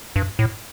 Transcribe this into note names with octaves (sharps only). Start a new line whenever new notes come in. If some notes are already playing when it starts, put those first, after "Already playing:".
G2
A2